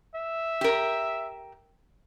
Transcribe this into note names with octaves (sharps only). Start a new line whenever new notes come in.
E5
G4 A#4